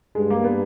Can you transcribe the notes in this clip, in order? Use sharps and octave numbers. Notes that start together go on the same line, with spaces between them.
G2 G#3
A#3
B3